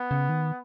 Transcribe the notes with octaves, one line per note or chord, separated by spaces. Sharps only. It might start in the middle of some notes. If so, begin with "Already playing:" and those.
Already playing: B3
C#3
D#3